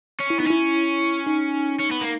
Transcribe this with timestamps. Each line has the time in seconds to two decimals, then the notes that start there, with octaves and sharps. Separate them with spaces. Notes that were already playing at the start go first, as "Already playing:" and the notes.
0.20 C#4
0.30 E4
0.40 B3 D#4
0.47 C#4 E4
1.27 D#4
1.80 C#4
1.91 B3
2.01 A#3